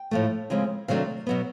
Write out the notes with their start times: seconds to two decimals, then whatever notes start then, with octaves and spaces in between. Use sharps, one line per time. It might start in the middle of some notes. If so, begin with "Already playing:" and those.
Already playing: G5
0.11 A2 F3 A3
0.50 C#3 F3 G#3 C4
0.88 C3 D#3 F#3 A3 D4 F5
1.27 B2 F#3 B3